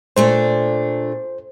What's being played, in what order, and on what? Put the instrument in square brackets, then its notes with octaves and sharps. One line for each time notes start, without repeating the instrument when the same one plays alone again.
[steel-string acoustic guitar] A#2 A3 D4 [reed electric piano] C5